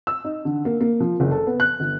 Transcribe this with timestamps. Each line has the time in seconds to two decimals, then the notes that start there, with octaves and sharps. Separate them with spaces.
0.07 E6
0.24 D#4
0.45 D3
0.65 A#3
0.81 A#3
1.00 F3
1.20 F#1
1.31 A4
1.47 B3
1.60 F#6
1.80 G1